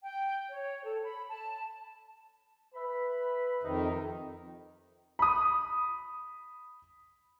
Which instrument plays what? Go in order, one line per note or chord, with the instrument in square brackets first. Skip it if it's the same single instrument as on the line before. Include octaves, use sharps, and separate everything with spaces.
[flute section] G5
C#5
A4
B5
A5
[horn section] B4 E5 B5
[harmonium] F2 D#3 [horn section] C3 D#4
[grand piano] B5 D#6